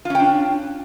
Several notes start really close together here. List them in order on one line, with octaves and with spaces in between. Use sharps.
F4 C#4 G5 D4